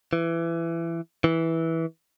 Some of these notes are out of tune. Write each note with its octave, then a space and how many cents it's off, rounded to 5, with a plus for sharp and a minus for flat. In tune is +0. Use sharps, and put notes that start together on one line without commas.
E3 +20
E3 -10